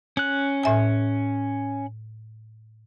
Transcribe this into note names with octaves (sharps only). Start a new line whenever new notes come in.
C#4 F#6
A2 E5 G#5